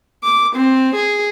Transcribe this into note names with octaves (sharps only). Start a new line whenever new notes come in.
D6
C4
G#4